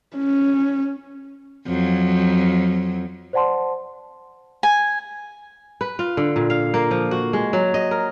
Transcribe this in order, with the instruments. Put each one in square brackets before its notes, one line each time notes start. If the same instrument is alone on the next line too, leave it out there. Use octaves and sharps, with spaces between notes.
[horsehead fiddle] C#4
[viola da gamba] F2 F#3
[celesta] C5 D5 F#5 A5 C6
[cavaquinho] G#5
[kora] B4
F4
D3
A#2
F5
A#3
F3
F#4
G#3
F#3
D#5
A#4